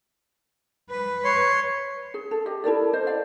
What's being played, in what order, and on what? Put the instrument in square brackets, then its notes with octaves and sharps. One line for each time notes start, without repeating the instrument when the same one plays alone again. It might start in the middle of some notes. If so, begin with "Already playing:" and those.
[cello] B4
[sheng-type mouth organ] C#5 C6
[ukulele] G#4
A4
G4 D#5
E4 A4 A#4 D5
C5 D#5
D5 F5